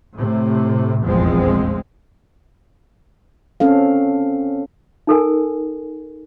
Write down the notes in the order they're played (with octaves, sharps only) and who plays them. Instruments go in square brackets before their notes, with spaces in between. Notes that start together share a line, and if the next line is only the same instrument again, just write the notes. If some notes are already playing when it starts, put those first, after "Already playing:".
[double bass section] A2 C3 A3
F1 A#1 E2 F3 G#3 C4
[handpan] C4 C#4 A4 F5
[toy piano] D#4 A4 A#4 G#5